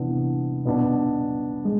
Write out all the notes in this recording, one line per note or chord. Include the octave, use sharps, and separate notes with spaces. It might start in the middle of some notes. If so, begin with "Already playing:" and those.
Already playing: C3 E3 B3 D4
B2 B3 D4
G#3